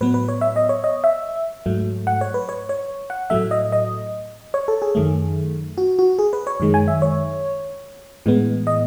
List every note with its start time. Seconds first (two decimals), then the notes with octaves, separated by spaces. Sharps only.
0.01 A2 F#3 B3 B4
0.14 B4
0.29 C#5
0.41 E5
0.56 D#5
0.69 C#5
0.84 D#5
1.04 E5
1.66 G#2 F#3 A3
2.07 F#5
2.21 C#5
2.34 B4
2.49 C#5
2.69 C#5
3.10 F#5
3.30 A2 F#3 A3 E5
3.51 D#5
3.72 D#5
4.54 C#5
4.68 A4
4.82 G#4
4.95 F#2 D#3 A3
5.78 F#4
5.99 F#4
6.19 G#4
6.33 B4
6.47 C#5
6.60 F#2 D#3 G#3
6.74 G#5
6.88 E5
7.02 C#5
8.26 A2 E3 G#3 B3
8.67 D#5